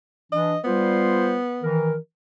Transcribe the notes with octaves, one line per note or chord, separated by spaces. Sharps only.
E3 D4 D#5
G3 B3 F4 C5
D#3 E3 A#4